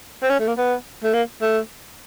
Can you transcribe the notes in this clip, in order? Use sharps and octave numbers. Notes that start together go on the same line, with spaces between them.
C4
C#4
A3
A#3
B3
A3
A#3
A3